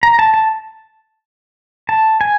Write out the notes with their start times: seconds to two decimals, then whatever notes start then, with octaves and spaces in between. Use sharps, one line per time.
0.03 A#5
0.19 A5
0.34 A5
1.89 A5
2.21 G#5